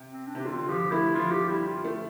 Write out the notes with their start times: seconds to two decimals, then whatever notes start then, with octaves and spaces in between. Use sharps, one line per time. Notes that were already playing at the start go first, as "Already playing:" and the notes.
Already playing: C3
0.10 C4
0.28 D4
0.35 C3
0.40 G4
0.45 D3 F4
0.69 F3 G4
0.92 A3 E4
1.15 F3 F4
1.31 G4
1.49 G3 E4
1.67 F4
1.85 A3